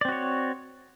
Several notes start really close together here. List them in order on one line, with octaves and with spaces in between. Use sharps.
D5 C4 F#4 C#5